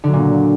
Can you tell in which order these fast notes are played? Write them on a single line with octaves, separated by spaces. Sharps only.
D3 F#3 A#2